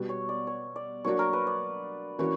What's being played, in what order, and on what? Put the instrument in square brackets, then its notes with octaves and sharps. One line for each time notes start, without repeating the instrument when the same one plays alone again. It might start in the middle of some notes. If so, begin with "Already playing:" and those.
Already playing: [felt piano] B2 G3 B3 F#4
[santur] C#5
D5
C#5
D5
[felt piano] F#3 A#3 D4 F#4 [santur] C#5
[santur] A#4
B4
D5
[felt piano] E3 A#3 C#4 F#4 [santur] C#5